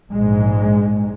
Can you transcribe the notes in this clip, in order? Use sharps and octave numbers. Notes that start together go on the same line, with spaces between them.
A#1 G#2 G#3